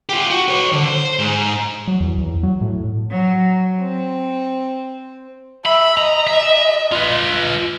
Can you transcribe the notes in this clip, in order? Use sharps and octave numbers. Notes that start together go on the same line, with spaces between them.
F4 G4
F#4
B4 C#5
D3
C5
G#2
F#3
E2
E2
F#3
A2
F#3
C4
E5 B5
D#5 A#5
E5
F4 B4